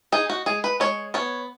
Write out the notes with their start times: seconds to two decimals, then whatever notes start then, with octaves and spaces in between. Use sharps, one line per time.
0.12 D#4 G#4
0.30 F#4
0.46 G#3 G#4
0.64 B4
0.80 G#3 C#5
1.14 B3 C#5